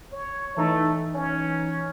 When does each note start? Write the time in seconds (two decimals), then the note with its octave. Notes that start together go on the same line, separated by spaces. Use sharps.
0.12 C#5
0.57 E3 A3 D#4
1.14 C#4